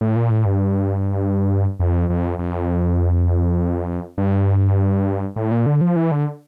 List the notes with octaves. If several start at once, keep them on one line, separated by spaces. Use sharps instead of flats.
A2
A#2
A2
G2
F2
F2
F2
G2
A2
A#2
D3
F3
E3
D3